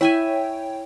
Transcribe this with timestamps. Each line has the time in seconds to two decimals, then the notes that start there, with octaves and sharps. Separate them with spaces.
0.01 E4 C#5 E5 G5 G#5